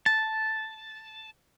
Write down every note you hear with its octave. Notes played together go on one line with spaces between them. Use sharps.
A5